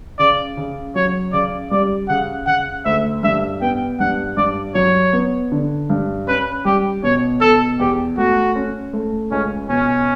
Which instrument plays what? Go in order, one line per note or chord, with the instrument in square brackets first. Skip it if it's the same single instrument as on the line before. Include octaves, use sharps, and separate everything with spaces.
[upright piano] C#3 [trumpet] D5
[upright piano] C#3
[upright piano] F#3 [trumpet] C#5
[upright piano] C#3 [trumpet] D5
[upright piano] G3 [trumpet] D5
[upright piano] C#3 [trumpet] F#5
[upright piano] C#3 [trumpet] F#5
[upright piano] D2 [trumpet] E5
[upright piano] G2 [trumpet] E5
[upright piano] B3 [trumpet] G5
[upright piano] G2 [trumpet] F#5
[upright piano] G2 [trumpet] D5
[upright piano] F#3 [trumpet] C#5
[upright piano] B3
D3
G2
[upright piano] C#4 [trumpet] B4
[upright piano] G3 [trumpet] G4
[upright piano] B2 [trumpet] C#5
[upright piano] B2 [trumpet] A4
[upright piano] E2 [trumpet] G4
[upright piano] A3 [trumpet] F#4
[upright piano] C#4
A3
[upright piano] C#2 [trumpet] C#4
[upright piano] B2 [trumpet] C#4